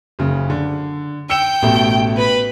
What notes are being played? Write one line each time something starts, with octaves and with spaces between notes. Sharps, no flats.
F#1 C#3
D3
G5 E6 C#7 E7
A1 B2 A3
B4 B5